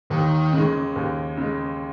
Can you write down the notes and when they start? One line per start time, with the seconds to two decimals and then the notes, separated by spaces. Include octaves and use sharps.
0.10 D#2 D#3
0.53 C#3 G#3
0.96 D#2
1.37 C#3 G#3